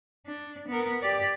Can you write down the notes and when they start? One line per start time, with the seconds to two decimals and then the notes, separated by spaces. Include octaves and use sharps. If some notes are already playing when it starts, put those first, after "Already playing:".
0.27 D4
0.68 B3 A#4
1.02 G4 D5